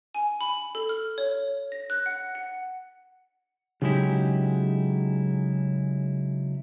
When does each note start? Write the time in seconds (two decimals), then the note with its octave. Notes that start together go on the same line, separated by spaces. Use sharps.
0.15 G#5
0.41 B5
0.75 A4
0.89 F6
1.18 C#5
1.72 A#6
1.90 F#6
2.06 F#5
2.35 F#5
3.82 C#3 F#3 G#3 D#4 E4 G4